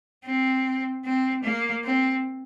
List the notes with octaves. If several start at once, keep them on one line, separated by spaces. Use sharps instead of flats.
C4
C4
A#3
C4